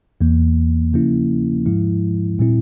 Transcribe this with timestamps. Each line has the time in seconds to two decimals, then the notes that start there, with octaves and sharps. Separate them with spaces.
0.21 E2 E3 A#3
0.93 C#3 F3 A#3 C#4 E4
1.66 G#2 F3 G#3 E4
2.39 A#2 G3 C4 E4